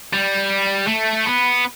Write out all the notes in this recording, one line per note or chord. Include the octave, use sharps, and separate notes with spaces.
G3
A3
B3